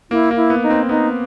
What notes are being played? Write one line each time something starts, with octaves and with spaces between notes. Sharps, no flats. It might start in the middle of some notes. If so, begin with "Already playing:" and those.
A#3 E4
A#3
E4
B3
D#4
C4
B3 D#4